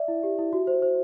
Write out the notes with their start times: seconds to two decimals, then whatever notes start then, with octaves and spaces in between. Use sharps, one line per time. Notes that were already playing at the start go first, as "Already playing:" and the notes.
Already playing: D5 E5
0.08 E4
0.23 G4
0.38 E4
0.53 F#4
0.67 C5
0.82 C5